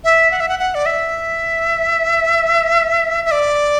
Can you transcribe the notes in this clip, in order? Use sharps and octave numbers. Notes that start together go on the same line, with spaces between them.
E5
F#5
E5
F#5
F#5
D5
E5
E5
D5